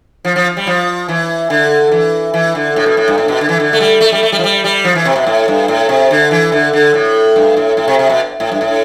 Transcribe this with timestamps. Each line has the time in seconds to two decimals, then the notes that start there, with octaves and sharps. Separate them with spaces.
0.25 F3
0.36 F3
0.57 G3
0.67 F3
1.09 E3
1.50 D3
1.91 E3
2.34 E3
2.55 D3
2.76 A2
2.86 B2
2.97 A2
3.08 G2
3.18 A2
3.28 B2
3.41 D3
3.49 E3
3.60 D3
3.73 A3
3.80 G3
4.01 A3
4.12 G3
4.23 A3
4.32 G3
4.39 F3
4.44 G3
4.64 G3
4.84 F3
4.95 E3
5.05 C3
5.16 B2
5.27 A2
5.48 G2
5.68 A2
5.89 C3
6.11 D3
6.31 E3
6.52 D3
6.73 D3
6.94 A2
7.36 G2
7.57 A2
7.77 A2
7.88 C3
7.99 C3
8.10 B2
8.40 A2
8.52 G2
8.61 A2